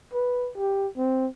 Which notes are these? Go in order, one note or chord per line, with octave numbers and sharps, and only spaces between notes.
B4
G4
C4